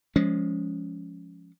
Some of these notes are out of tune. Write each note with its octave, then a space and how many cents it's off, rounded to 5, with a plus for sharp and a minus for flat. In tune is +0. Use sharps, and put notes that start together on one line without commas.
F3 +0 G#3 +0 C#4 +15